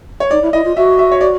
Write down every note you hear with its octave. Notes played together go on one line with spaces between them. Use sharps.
C#5
D#4 D5
E4
E4 D#5
F4
F#4 E5
E5
C#5
D5